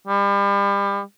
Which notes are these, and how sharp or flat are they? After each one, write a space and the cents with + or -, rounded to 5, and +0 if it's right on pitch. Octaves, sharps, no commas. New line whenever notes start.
G3 +35